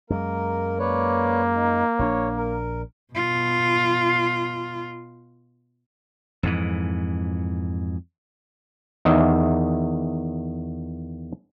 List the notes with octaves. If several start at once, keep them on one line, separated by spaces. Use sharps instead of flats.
F#2 G#3 A#3 A#4
A#3 B4 C#5 D5
D#4
A#1 C#4 D4 C#5
A#4
B2 F4
F2 G#2 E3
E2 D#3 D#5 E5